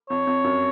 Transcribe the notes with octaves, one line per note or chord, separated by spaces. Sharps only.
F2 C#5
F2
F#2